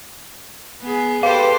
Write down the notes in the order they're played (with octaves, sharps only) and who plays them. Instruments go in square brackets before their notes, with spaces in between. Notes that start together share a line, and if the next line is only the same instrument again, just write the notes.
[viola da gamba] B3 G#4
[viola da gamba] G4 A4 C5 [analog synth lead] B4 [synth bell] F5